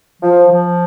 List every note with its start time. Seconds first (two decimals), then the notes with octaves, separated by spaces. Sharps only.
0.23 F3
0.50 F3